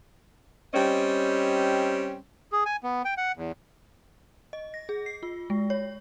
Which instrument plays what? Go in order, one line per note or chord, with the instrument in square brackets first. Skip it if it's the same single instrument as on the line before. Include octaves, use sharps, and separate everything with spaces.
[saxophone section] G3 C4 C#4 D#5
[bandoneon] G#4
G#5
B3
G5
F#5
E2
[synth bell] D#5
A#6
G#4
C7
F4
G#3
C#5